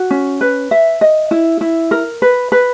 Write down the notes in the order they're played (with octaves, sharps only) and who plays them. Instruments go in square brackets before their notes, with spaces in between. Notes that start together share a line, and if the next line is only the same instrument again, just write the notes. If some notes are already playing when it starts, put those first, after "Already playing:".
Already playing: [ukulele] F#4
C#4
B4
E5
D#5
E4
E4
A#4
B4
B4